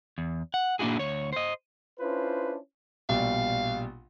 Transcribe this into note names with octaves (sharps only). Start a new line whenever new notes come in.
E2
F#5
A#2 A#3 D4 E4 F#4 G#4
D2 C#5
C5 D#5
C#4 D4 E4 F4 B4 C5
A#1 B2 G3 F5